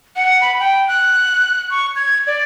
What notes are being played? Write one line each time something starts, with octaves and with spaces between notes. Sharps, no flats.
F#5
B5
G5
F#6
C#6
G#6
D5